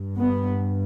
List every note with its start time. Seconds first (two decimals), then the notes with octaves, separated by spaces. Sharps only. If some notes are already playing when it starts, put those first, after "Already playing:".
Already playing: G2
0.19 B3